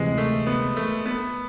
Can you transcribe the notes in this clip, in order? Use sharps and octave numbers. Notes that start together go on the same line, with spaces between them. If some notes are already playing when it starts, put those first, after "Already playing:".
Already playing: D2 C3 E3 G#3
A3
B3
A3
B3